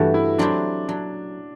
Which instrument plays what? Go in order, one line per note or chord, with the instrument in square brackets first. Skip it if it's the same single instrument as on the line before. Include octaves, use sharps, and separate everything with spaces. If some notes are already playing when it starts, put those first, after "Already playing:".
Already playing: [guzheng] G2 E3 A3 [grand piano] F#4 G4
[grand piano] E4
[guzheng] F#3 C4 E4 G4 [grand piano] D4
[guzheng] F#3 [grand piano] D4